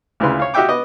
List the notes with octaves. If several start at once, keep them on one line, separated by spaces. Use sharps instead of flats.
D2 C#3 E4 F4 B4 C6
C#5 F5
F#4 G4 D#5 E5 G5 D6
B3 D#5 D6